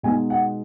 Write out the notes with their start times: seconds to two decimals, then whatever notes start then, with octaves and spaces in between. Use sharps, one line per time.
0.03 B2 G#3 D#4 G#5
0.30 F#5